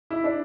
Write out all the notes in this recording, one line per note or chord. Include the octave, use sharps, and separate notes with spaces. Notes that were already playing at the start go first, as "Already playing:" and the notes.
E4
D4